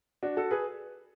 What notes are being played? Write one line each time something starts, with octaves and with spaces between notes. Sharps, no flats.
D4 F#4
F#4 A4
G#4 B4